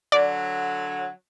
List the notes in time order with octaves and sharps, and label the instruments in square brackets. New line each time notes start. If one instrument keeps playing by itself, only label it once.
[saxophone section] D3 F#3 [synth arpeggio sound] D5